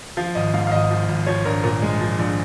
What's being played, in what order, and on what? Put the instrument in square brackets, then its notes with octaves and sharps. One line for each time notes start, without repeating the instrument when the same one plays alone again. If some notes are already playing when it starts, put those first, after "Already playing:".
[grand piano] F3 F5
G#1 D#5
G#2 F5
F5
G#1 D#5
F3
G#1
F3 C#5
A#1 A#4
A#2 A#4
G#3
F3
A#1